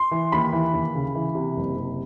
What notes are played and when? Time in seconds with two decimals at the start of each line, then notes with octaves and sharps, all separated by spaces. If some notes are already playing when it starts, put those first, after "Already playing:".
Already playing: C6
0.11 E3
0.32 D#2 B5
0.53 E3
0.73 D#2
0.95 C#3
1.15 E3
1.35 C3
1.56 F#1
1.77 C3